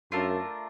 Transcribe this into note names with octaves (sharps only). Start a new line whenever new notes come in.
F#2 A3 D4 F4 A#4